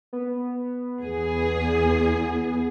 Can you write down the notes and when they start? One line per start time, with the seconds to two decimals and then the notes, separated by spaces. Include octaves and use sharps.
0.13 B3
1.02 E2 G#4